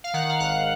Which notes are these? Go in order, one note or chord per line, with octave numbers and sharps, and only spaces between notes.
F5
D#3 F#5
F5
G#1 F#5